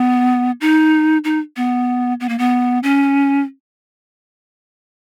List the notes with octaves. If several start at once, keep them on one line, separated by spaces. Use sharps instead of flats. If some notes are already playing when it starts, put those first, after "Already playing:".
Already playing: B3
D#4
D#4
B3
B3
A#3
B3
C#4